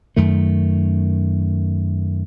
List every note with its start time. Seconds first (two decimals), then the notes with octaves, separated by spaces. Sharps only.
0.16 F#2 D#3 A3